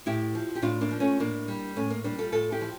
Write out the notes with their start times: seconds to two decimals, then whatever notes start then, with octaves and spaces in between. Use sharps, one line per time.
0.06 A2 E4 G4
0.35 F3
0.55 G4
0.62 A2 D4 F4
0.81 A#3 D4
0.91 F3
1.00 A3 C#4
1.20 A2 A#3 D4
1.48 G3
1.76 A2 A3 C#4
1.90 A#3
2.04 G3 A#3 D4
2.18 F4 A4
2.32 A2 F4 A4
2.52 E4 G4
2.61 F3